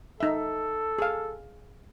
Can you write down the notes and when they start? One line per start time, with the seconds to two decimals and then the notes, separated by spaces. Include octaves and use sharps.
0.20 D#4 A4 E5
0.99 G#4 F5